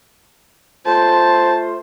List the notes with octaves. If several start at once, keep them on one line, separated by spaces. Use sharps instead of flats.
A3 F4 C5 A5